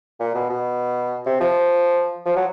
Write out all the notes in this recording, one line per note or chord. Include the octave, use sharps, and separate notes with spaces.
A#2
B2
B2
C3
F3
F3
F#3